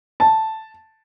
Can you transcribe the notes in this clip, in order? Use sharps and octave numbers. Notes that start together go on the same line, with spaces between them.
A5